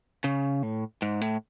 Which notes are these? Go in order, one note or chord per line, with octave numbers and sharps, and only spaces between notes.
C#3
A2
G#2
A2